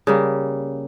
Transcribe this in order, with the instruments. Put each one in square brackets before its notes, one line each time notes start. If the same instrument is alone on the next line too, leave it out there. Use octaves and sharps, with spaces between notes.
[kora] C#3 G3 A#3